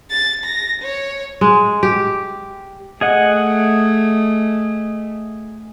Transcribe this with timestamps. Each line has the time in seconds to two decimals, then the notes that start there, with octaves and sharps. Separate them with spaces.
0.10 A6
0.45 A#6
0.82 C#5
1.41 G#3
1.83 G4
3.01 A3 G#4 D#5 F#5